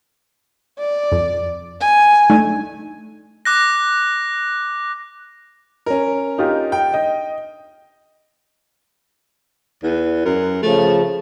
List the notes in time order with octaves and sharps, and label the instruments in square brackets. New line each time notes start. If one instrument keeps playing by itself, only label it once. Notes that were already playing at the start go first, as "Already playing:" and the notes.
[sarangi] D5
[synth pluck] F2
[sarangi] G#5
[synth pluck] A3 D4 D#4
[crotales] D6 F#6 A#6
[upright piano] C#4 A#4
[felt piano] D#4 F4 G4
[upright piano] G5
[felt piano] D#5
[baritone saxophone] E2
F#2
[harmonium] C#3 F3 [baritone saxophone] A3